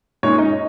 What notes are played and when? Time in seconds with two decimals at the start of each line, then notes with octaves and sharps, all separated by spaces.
0.23 A#2 G#3 C#4 D#4 C#5
0.38 D#4 D#5